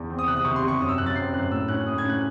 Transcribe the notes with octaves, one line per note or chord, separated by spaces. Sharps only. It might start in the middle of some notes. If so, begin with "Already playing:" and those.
Already playing: E2
C4
D#6
C3 F#6
D#6
C3 C#6
C6
C3
C#6
F#2 D#6
E6
F#2 F#6
A6
C4 C7
F#2 F#6
A2 E6
C#4 F#6
A2 D#6
G#6
C#4
F#6